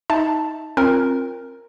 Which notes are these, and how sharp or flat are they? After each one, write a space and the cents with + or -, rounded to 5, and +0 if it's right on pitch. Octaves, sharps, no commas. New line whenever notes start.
D#4 +15 E5 +0 A5 +0
C4 +30 F4 +0 A#4 +0